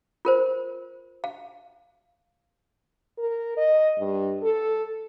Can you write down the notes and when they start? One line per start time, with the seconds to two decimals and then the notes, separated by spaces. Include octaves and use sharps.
0.25 F4 A#4 C5
1.24 F5
3.18 A#4
3.57 D#5
3.99 G2
4.42 A4